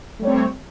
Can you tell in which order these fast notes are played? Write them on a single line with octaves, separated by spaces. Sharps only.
A3 G3 C#5 C4